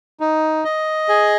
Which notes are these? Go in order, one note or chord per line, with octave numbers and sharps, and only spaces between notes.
D#4
D#5
G#4